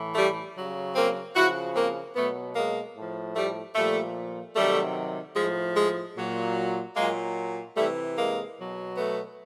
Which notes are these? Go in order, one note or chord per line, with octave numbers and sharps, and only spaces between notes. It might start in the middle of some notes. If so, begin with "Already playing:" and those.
Already playing: A2 E3
G3 A3
C#3 F#3
A#3 C4
C#3 F3 E4 F#4
A#3 C4
B2 F#3 A3 B3
G#3 A#3
A2 F3
G3 A3
A#2 F3 G3 A3
C3 D#3 F#3 G3 A3
A2 F3 G#3
G#3
A#2 F#3
A#2 F#3 G#3 A#3
C3 E3 G3 A3
G#3 A#3
B2 F#3
A3 B3